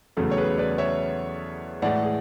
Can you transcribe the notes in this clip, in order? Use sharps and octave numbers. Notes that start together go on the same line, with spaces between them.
E2 C#3 F#3 A3 A4
C#5
G#4 B4
B4 D5
C#5 E5
A2 E3 G#3 D5 F#5
G#4